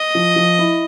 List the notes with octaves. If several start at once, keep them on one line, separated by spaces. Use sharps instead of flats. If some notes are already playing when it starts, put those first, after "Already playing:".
Already playing: D#5
F3
F3
E4